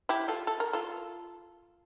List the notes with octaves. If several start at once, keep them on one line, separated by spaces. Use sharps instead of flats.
E4 G4
F4 A4
A4
A#4
F4 A4